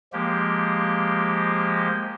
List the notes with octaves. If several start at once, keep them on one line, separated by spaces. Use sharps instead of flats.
F3 G#3 A#3 G4